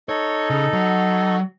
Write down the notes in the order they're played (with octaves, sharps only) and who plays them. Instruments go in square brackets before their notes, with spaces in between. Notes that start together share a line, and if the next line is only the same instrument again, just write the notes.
[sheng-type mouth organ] D#4 A4 [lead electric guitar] C#5
[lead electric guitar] C#3
F#3